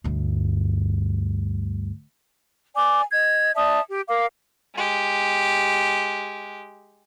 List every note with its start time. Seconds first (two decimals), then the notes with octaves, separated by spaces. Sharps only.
0.04 D2 G2
2.75 D5 G#5 D6
3.12 D#5 G#6
3.54 D5 E5 A5 D#6
3.88 G4
4.09 A#4 F5 D6
4.75 G#3 G4